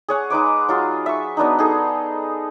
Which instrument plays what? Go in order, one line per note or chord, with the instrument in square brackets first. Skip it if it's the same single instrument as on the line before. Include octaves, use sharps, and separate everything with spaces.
[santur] G#4 C#5 F#5
G#3 D#4 B4 D6
F#3 F4 G#4
E5 C#6
F#3 B3 D4 D#4
D#4 G#4 A4